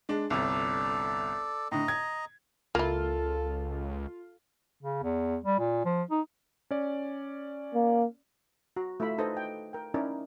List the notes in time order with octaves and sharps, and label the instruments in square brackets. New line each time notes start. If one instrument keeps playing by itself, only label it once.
[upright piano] G#3 D4
[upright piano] G1 C2 [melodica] A4 D5
[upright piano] A2 D3 [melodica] D#5 A#5
[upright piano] G#6
[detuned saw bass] C#2 [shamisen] A#3 E4 [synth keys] F4 [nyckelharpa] A4
[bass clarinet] C#3
E2
G3
A#2
F3
D#4
[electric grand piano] C#4 D5
[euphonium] A#3
[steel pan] F#4 A#5
A3 E4 F4 E5 B5
D#4 A4 B4 C5 D#5
G5
A#4 G5
C#4 D#4 E4 A#4 D5